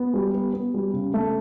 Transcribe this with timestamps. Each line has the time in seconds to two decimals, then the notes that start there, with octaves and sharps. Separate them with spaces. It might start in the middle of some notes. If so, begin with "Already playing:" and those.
Already playing: B3
0.14 G3
0.34 B3
0.53 B3
0.74 G3
0.93 C#3
1.14 A3